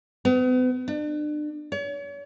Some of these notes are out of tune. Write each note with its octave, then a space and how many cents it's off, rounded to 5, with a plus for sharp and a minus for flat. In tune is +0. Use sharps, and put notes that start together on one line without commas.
B3 +40
D4 +35
C#5 +40